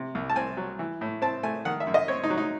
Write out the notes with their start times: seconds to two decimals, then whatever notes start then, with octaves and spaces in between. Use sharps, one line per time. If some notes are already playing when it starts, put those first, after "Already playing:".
Already playing: C3
0.15 C2
0.30 A5
0.36 C4 G#5
0.57 F#3
0.79 E3
1.01 A2
1.22 C4 A5
1.43 A3 G#5
1.65 D#3 F#5
1.80 E5
1.87 F#2
1.94 D#5
2.08 C4 C#5
2.24 D#4
2.30 F#3
2.38 D#4